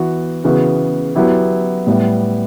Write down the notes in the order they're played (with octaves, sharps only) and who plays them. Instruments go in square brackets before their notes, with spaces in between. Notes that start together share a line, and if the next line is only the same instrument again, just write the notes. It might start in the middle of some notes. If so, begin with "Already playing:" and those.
Already playing: [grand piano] E3 B3 F#4
C#3 E3 B3 F#4
F#3 B3 E4 G4
A2 G3 B3